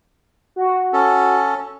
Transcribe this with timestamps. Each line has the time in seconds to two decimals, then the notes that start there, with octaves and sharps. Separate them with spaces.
0.56 F#4
0.93 C#4 A4